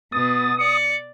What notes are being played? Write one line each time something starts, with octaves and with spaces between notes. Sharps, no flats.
B2 B3 D#6 A6
D5 C#7